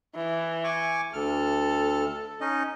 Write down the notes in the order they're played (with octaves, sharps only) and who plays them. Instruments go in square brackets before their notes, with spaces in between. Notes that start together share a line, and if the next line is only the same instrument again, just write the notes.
[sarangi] E3
[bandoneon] G#5 C#6 D6
[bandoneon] D2 F6 [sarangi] A4
[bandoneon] C#4 D#4 D#5